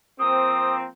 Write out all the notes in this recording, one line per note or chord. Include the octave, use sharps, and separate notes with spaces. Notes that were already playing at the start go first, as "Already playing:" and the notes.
F3 A#3 C4 D#6